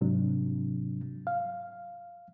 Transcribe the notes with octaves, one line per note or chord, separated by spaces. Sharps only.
G#2 C3 F#3 D4
F5